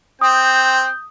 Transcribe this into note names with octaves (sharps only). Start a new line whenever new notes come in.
C4 D#6 G6